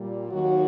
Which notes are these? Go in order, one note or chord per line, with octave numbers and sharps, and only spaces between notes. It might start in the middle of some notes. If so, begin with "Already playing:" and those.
Already playing: A#2 G3
D#2 D#3 F#3 F#4